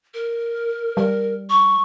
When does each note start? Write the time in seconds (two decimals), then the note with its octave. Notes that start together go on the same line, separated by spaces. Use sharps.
0.14 A#4
0.97 G3 A#4
1.50 C#6